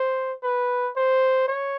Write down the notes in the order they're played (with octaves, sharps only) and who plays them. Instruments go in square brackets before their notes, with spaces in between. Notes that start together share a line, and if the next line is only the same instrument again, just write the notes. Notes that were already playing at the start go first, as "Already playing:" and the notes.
Already playing: [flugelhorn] C5
B4
C5
C#5